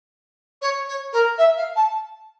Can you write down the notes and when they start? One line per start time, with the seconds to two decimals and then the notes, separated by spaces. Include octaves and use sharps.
0.61 C#5
0.87 C#5
1.13 A#4
1.38 E5
1.57 F5
1.76 A5